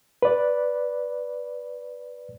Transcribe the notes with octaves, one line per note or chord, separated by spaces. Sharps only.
B4 D5